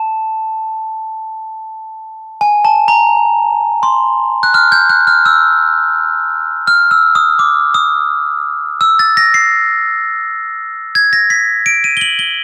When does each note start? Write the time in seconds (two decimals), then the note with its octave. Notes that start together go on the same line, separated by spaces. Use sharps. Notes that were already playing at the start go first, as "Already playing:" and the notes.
Already playing: A5
2.41 G#5
2.65 A5
2.88 A#5
3.83 C6
4.43 F#6
4.54 F6
4.72 G6
4.89 F#6
5.07 F6
5.26 E6
6.67 F6
6.91 E6
7.15 D#6
7.39 D6
7.74 D#6
8.81 E6
8.99 A6
9.17 A#6
9.34 C7
10.95 G#6
11.13 A#6
11.30 B6
11.66 D7
11.84 D#7
11.97 G7
12.01 F#7
12.19 G7